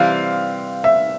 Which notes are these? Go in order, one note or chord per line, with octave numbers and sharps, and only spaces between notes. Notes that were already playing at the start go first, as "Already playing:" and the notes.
Already playing: C3 E3 G3 C4 F5
E5